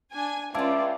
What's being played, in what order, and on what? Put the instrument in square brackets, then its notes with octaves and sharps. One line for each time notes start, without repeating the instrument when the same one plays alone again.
[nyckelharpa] D4 [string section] G#5
[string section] C#2 [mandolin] E4 F4 [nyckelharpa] D5 [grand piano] F5 A5 D6